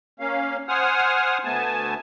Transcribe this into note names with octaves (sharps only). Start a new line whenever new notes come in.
A#3 C#4 F5
C5 F#5 G#5 D#6 F6
D2 A3 B3 G#5 A5